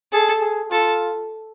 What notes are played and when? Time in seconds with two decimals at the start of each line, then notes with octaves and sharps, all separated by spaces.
0.12 G#4 A4
0.42 G#4
0.71 F4 A4